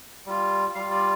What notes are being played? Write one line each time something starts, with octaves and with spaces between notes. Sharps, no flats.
G3 F4
G3 F4 F5
D5